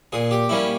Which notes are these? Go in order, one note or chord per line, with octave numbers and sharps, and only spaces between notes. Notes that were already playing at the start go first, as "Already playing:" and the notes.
A#2 G#4
G4
G3 A#3 C#4 E4